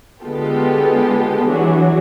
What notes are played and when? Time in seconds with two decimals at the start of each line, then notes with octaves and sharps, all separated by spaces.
0.22 D3 G#3 B3 F4 G4 A4
1.46 E3 F#3 D4 F#4 G#4